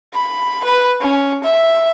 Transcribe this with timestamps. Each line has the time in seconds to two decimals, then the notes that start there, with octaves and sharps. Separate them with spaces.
0.14 B5
0.64 B4
1.01 C#4
1.44 E5